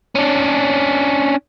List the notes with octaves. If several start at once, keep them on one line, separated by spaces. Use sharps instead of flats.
C#4 D4